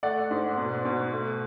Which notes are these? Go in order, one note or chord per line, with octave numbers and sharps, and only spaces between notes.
A3 D5 F#5
G#2
B2
B2
A3